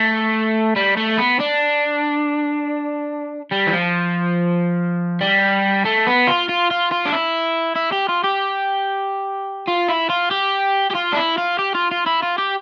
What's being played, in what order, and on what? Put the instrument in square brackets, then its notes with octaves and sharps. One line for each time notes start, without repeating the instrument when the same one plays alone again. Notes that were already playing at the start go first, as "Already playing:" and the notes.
Already playing: [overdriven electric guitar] A3
G3
A3
B3
D4
G3
E3
F3
G3
A3
B3
F4
F4
F4
F4
D4
E4
E4
G4
F4
G4
F4
E4
F4
G4
G4
F4
D4
E4
F4
G4
F4
F4
E4
F4
G4